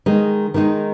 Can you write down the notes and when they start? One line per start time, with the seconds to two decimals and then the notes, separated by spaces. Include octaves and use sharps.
0.06 D#3 G#3 D#4
0.54 D#3 G#3 D#4